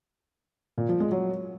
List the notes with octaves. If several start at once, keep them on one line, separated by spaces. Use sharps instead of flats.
A#2
F3
G#3
F#3